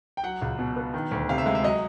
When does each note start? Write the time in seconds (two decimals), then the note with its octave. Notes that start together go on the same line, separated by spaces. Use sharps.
0.17 G5
0.23 F#3 F#5
0.42 C#2
0.59 B2
0.76 B3
0.94 D#3
1.11 D2
1.29 C3 F5
1.38 E5
1.46 G#3 F5
1.55 E5
1.63 F#3 D#5